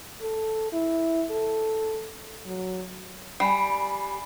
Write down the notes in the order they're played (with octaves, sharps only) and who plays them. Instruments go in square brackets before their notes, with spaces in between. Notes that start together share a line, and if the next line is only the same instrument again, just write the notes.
[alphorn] A4
E4
A4
F#3
[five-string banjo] G3 [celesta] G#5 B5 C7